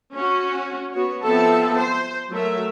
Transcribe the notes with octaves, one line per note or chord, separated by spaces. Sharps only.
C#4 F#4
B3 F#4 C#5
F3 B3 C4 A4 E5 A5
C5
F#3 A3 A#4 E5